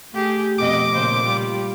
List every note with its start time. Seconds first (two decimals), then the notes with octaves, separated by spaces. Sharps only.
0.13 A3 G4 G#4
0.58 F2 B2 D#5 D6
0.94 A#2 C#3 C5
1.23 G3 F4